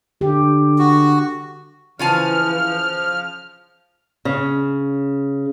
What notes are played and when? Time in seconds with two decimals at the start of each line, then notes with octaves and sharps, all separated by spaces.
0.21 D3 G4
0.78 F#4
1.99 C#3 E3 F3 F4 G#5 F6
4.25 C#3